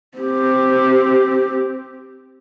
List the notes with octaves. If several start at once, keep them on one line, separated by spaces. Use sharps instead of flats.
C4 G4